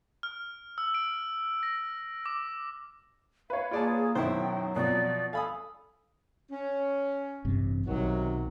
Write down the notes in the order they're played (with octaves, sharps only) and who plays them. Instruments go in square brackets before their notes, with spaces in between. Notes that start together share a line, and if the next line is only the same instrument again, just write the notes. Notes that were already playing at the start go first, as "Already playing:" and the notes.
[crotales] F6
E6
D7
A#6
D6
[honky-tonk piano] B4 C#5 [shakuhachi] F5
[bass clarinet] A#3 [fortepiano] F4 D5 A5 [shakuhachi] G#4
[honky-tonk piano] F#2 B2 D#3 [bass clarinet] F#3 [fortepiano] E4 C5 [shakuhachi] G5
[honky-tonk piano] F2 B2 F3 [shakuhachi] D5
[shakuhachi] A4 [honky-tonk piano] F5 [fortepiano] G#5 B5 D#6
[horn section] C#4
[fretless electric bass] A1 G2 C3
[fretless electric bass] B1 [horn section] C3 D#3 F#3